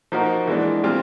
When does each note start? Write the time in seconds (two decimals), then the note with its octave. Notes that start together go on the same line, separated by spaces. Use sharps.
0.12 F3 A#3 D#4 F#4 A#4
0.47 E3 G#3 B3 D4
0.84 A#2 G3 C4 F4